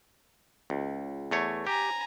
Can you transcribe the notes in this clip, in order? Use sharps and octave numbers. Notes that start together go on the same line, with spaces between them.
C#2
E2 A3 C#5
G4 G#5 A#5